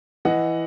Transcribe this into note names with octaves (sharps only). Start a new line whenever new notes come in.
E3 D#5 F#5